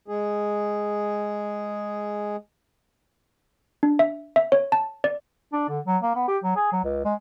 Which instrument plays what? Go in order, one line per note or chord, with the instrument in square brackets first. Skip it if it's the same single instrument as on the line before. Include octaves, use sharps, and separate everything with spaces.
[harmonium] G#3 G#4
[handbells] D4
E5
E5
C#5
A5
D5
[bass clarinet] D4
D3
F#3
A#3
B3
G4
F#3
G#4
F#3
C#2
G#3